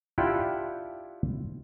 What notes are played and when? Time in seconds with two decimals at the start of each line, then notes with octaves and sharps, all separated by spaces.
0.18 D4 E4 F4 G4 F#5 G5